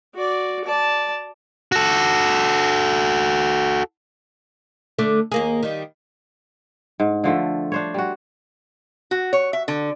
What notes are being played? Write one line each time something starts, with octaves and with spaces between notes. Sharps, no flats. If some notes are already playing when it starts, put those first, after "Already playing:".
F#4 D5
D5 A5
F#4 A4
D3 A3 D5
D#2 A#3 G#4
D#3 G3
G#2
D3 F3 A3
D4 C5 C#5
G3 F#4
F#4
C#5
E5
D3